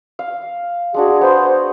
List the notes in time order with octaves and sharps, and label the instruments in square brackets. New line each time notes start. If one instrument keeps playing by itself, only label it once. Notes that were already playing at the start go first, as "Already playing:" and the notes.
[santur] F5
[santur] G#3 D4 F#4 [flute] G#4
[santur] B3 G#4 [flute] C5